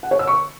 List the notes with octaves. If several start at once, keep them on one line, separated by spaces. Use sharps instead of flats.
F#5
C#5
E6
C#6